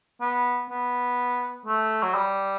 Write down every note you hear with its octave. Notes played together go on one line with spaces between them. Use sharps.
B3
B3
A3
F#3
G3